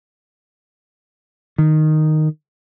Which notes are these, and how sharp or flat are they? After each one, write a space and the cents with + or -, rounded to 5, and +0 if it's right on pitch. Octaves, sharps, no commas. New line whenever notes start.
D#3 -5